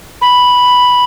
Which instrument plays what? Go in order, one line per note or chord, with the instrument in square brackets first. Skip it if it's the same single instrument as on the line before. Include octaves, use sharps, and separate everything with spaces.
[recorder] B5